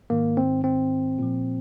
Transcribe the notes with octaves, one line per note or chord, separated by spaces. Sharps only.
G#2 D#3 A#3
C4
C4
A#2 F3